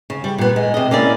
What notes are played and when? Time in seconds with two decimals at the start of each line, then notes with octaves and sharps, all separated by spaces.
0.10 C#3
0.24 G3
0.38 A#2 B3
0.56 G#3
0.74 C3 D#5
0.91 A#3 C#4 E4 D5